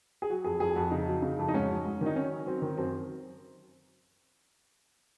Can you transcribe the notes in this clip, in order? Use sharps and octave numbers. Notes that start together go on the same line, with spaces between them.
G#4
F#3 F#4
F2 G#4
F2 G#4
F2 F#4
C#3 D#4
F#3
C#3
F2
D#4
G#2 C#4
F#3
G#2
D#3
D#4
F#3 C#4
F#3
F#3 C4
D#3
F#2 C4